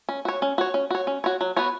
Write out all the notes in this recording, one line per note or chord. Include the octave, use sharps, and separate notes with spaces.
C#4
F#4 C#5
C#4
F#4 C#5
C#4
F#4 C#5
C#4
F#4 C#5
F#3
B3 F#4 C#5